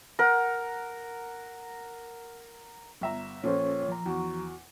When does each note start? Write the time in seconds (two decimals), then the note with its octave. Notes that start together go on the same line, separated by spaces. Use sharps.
0.19 A#4 F#5
3.01 G1 B3 E5 A#5
3.44 A#1 A#2 C#4 A4 C5 C#5
3.89 F3 A#5
4.06 E2 F#4